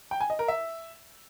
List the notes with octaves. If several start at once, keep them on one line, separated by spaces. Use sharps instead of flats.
G5
G#5
D#5
A#4
E5